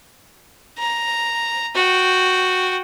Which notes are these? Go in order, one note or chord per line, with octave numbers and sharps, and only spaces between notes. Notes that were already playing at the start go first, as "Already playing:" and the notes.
A#5
F#4 G5